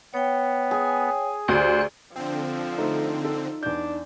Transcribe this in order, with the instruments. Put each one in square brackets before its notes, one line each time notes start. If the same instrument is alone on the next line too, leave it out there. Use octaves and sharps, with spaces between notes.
[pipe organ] B3 [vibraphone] C#5 G5
[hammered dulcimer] G#4 G#5
[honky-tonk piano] D2 [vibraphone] G4 D5 [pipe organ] C5 F#6
[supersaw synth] D3 C4 [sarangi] F3 [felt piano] G5
[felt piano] A3 [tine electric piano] D#4
[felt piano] A4
[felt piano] E2 G6 [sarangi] D4